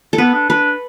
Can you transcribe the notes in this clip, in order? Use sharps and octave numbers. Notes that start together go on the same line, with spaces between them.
A4
B3 B4
D4
D4 B4